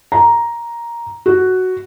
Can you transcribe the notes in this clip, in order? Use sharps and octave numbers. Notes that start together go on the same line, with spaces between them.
A#5
F#4